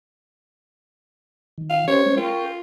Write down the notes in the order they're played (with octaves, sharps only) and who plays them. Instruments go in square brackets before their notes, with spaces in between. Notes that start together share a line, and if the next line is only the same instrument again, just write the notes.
[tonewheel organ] D#3
[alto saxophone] F5
[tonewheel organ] C#4 G4 C5 [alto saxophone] C#5
[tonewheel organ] G#3 C#4 C5
[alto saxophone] F4 [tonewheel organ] A#4 G5 C#6